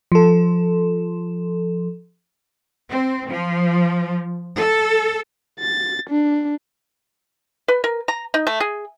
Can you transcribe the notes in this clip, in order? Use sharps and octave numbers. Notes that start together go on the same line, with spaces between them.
F3 A4
C4
F3
A4
A6
D4
B4
A#4
A#5
D#4
A3
G#4